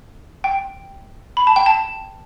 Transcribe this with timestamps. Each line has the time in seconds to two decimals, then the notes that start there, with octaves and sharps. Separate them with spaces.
0.44 G5
1.37 B5
1.47 A5
1.56 G5
1.66 A5